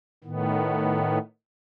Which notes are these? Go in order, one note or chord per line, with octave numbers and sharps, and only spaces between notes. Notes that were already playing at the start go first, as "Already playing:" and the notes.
A2 D#3 B3